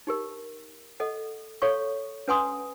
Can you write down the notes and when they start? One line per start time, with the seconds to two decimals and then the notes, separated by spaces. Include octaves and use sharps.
0.07 D#4 G4 A#4
1.00 A4 D#5 F#5
1.62 A4 C#5 F5 C#6
2.28 C#4 B4 F#5 G#5 C6 D#6